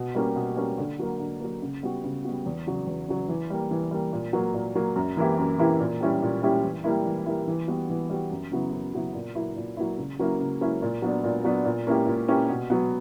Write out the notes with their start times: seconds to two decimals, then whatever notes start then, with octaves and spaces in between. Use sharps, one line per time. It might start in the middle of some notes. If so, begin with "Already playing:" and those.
Already playing: B2
0.15 G3 A#3 C#4 G4
0.36 B2
0.57 G3 A#3 C#4 G4
0.78 D3
0.99 F#3 A#3
1.19 D3
1.40 F#3 A#3
1.62 C#3
1.83 G3 B3 F#4
2.04 C#3
2.24 G3 B3 F#4
2.46 E2
2.67 C#3 F#3
2.87 E2
3.08 C#3 F#3
3.28 E3
3.50 G3 A#3
3.71 E3
3.91 G3 A#3
4.13 A#2
4.33 F#3 A#3
4.54 A#2
4.75 F#3 A#3
4.96 F#2
5.17 E3 A#3 E4 G4
5.38 F#2
5.58 E3 A#3 E4 G4
5.80 A#2
6.00 G3 C#4 E4 G4
6.22 A#2
6.42 G3 C#4 E4 G4
6.63 E3
6.84 G3 A#3 E4
7.05 E3
7.26 G3 A#3 E4
7.48 E3
7.68 G3 B3 F#4
7.89 E3
8.10 G3 B3 F#4
8.31 F#2
8.51 C#3 F#3 B3 E4
8.72 F#2
8.94 C#3 F#3 B3 E4
9.15 A#2
9.35 F#3 A#3 E4
9.56 A#2
9.77 F#3 A#3 E4
9.98 C#3
10.19 F#3 A#3 C#4 E4
10.40 C#3
10.61 F#3 A#3 C#4 E4
10.82 A#2
11.02 F#3 B3 D4
11.24 A#2
11.44 F#3 B3 D4
11.65 A#2
11.87 A#3 C#4 E4 G4
12.07 A#2
12.28 A#3 C#4 E4 G4
12.49 B2
12.70 F#3 B3